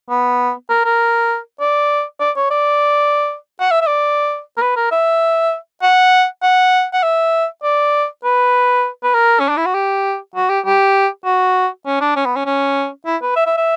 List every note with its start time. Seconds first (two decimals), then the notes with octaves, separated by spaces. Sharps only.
0.10 B3
0.69 A#4
0.85 A#4
1.60 D5
2.20 D5
2.36 C#5
2.50 D5
3.60 F#5
3.71 E5
3.81 E5
3.87 D5
4.57 A#4
4.61 B4
4.76 A#4
4.92 E5
5.82 F#5
6.43 F#5
6.93 F#5
7.03 E5
7.63 D5
8.24 B4
9.03 B4
9.14 A#4
9.40 C#4
9.49 D4
9.57 E4
9.66 F#4
9.74 G4
10.35 F#4
10.49 G4
10.65 G4
11.25 F#4
11.86 C#4
12.01 D4
12.16 C#4
12.26 B3
12.36 C#4
12.46 C#4
13.06 E4
13.22 B4
13.36 E5
13.46 E5
13.57 E5